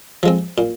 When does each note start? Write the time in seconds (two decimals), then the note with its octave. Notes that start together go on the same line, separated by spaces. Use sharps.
0.23 F3 G#3 C4
0.58 A#2